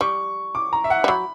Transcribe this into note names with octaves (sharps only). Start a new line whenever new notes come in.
G3 C#6
D6
A#5
E5
F#5
G3
F#3 B5